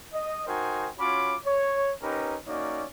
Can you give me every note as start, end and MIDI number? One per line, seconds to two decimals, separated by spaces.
0.14 0.45 75
0.47 0.90 63
0.47 0.90 66
0.47 0.90 70
0.47 0.90 72
0.47 0.90 79
0.47 0.90 80
0.99 1.35 61
0.99 1.35 65
0.99 1.35 66
0.99 1.35 73
0.99 1.35 83
0.99 1.35 86
1.46 1.92 73
2.02 2.37 61
2.02 2.37 63
2.02 2.37 67
2.02 2.37 70
2.02 2.37 71
2.47 2.85 58
2.47 2.85 61
2.47 2.85 63
2.47 2.85 66
2.47 2.85 73
2.47 2.85 74